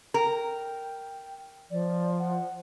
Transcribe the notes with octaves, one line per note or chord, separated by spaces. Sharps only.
A#4 G5
F3 D5
F#5